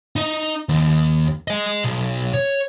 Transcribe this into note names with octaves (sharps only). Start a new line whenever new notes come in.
D#4 D#5
D#2
D#5 G#5
B1
C#5